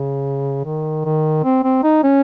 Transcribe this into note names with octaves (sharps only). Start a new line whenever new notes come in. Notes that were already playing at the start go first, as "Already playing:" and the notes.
Already playing: C#3
D#3
D#3
C4
C4
D#4
C#4